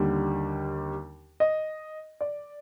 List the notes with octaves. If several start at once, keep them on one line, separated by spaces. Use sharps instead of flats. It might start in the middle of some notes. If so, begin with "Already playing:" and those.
Already playing: D#2 D3 G3
D#5
D5